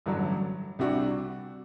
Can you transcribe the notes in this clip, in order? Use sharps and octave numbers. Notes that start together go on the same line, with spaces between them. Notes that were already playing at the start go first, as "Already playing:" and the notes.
A1 G2 D3 F#3
C2 C3 G3 D4 F#4